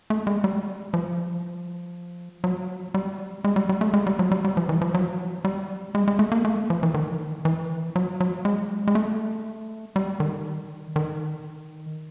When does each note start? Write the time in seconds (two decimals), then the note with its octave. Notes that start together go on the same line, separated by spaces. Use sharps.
0.10 A3
0.27 G#3
0.44 G3
0.94 F3
2.44 F#3
2.94 G3
3.44 G#3
3.56 G3
3.69 G3
3.81 A3
3.94 G#3
4.07 G3
4.19 F#3
4.32 G3
4.45 G3
4.57 F3
4.69 E3
4.81 F3
4.94 F#3
5.45 G3
5.95 G#3
6.08 G#3
6.19 A3
6.32 A#3
6.45 A3
6.70 F3
6.83 E3
6.94 D#3
7.45 E3
7.96 F#3
8.20 F#3
8.45 G#3
8.88 G#3
8.95 A3
9.96 G3
10.20 D#3
10.96 D#3